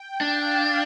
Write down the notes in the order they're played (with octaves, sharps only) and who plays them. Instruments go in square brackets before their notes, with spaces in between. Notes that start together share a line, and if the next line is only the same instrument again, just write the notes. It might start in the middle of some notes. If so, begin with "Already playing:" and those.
Already playing: [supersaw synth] G5
[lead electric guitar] D4 [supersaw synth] F5